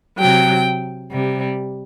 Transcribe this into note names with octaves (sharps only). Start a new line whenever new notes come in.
C3 F#3 G5
C3 G3